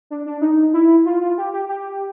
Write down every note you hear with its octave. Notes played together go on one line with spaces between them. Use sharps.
D4
D4
D#4
E4
F4
F4
G4
G4
G4